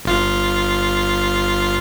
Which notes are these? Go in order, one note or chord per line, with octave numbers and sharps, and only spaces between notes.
G1 F4 F5